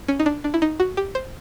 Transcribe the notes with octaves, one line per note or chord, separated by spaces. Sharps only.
C#4
D#4
D4
D4
E4
D#4
F#4
G4
C5